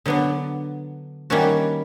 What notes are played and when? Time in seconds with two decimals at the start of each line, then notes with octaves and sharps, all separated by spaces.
0.06 D3 F#3 B3 D4
1.30 D#3 G3 A#3 C#4 F#4